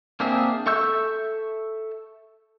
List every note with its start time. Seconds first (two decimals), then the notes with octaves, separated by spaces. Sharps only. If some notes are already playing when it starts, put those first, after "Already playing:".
0.20 A#3 C4 D4 G#4 E5
0.66 A4 E5 C#6 E6 G6